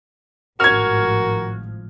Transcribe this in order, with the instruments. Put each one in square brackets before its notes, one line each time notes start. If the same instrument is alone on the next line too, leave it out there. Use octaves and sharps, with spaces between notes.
[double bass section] G#1 A2 F3 [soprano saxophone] F#4 [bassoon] A#4 [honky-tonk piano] F6 G#6